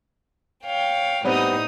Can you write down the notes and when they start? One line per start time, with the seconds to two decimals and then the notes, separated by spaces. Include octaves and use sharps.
0.65 C#5 F5 G5
1.25 A2 G3 B3 C4 D#4 D#6